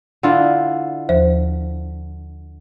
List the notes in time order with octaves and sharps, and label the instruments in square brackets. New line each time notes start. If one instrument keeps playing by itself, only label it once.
[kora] D3 E4 F4
[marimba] D#2 F3 C5